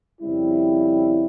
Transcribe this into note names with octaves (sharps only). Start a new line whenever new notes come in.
F2 C#3 G3 C4 E4